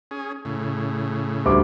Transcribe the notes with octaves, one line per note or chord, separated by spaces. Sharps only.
C#4 G#4
A2 C#3
D2 G3 D6